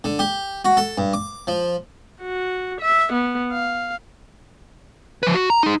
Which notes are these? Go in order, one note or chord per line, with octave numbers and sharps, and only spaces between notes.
D3
G4
F#4
A4
G2
D6
F3
F#4
E5
B3
F5
F3 B4
F#4
A#5
D#4 G#4